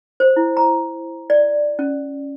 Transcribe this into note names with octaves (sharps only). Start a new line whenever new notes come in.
C5
E4
A#5
D5
C#4